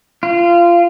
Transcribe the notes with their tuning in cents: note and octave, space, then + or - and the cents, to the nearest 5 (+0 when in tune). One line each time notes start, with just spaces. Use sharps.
F4 -20